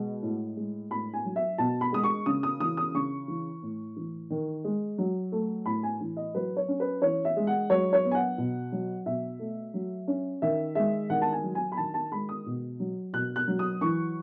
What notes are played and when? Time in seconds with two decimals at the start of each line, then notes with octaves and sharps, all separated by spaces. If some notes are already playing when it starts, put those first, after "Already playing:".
Already playing: B2 G#3
0.22 A2
0.57 G#3
0.90 A2 B5
1.14 G#5
1.25 F#3
1.36 E5
1.58 B2 A5
1.81 B5
1.92 G#3 D#6
2.04 C#6
2.26 C#3 D#6
2.43 D#6
2.60 E3 D#6
2.77 D#6
2.94 C#3 C#6
3.28 E3
3.62 A2
3.96 E3
4.30 D#3
4.64 G#3
4.98 F#3
5.32 A3
5.66 A2 B5
5.83 G#5
6.00 E3
6.17 D#5
6.35 F#3 B4
6.57 C#5
6.68 C#4
6.80 B4
7.02 E3 C#5
7.25 E5
7.37 G#3
7.47 F#5
7.70 F#3 C#5
7.93 C#5
8.05 B3
8.11 G#5
8.15 F#5
8.38 B2
8.72 F#3
9.06 B2 E5
9.39 A3
9.74 F#3
10.08 C#4
10.42 D#3 E5
10.75 G#3 E5
11.10 D#3 F#5
11.22 A5
11.32 G#5
11.44 F#3
11.55 G#5
11.72 B5
11.77 D#3 A5
11.94 A5
12.12 G#3 B5
12.29 D#6
12.46 B2
12.80 F#3
13.13 B2 F#6
13.36 F#6
13.48 F#3
13.59 D#6
13.81 E3 C#6